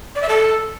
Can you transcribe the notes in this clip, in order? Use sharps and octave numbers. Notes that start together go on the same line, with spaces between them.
D5
E5
A4